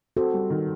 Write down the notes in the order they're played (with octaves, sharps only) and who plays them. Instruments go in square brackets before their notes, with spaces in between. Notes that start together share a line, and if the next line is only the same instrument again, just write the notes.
[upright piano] C4 [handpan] F#4 A4
[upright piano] G3
D#3